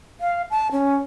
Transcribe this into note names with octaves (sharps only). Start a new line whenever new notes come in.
F5
A5
C#4